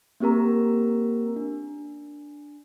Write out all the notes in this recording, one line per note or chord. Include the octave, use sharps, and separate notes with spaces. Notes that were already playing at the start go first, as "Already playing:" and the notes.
A#3 C4 G4 A#4 A#5
D4